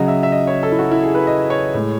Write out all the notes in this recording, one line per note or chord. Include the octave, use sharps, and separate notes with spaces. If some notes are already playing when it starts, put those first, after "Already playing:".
Already playing: C#3 F#3 D#5
E5
E5
D#5
C#5
A4
E4
F#4
E4
G#4
B4
D#5
C#5
A2 G#3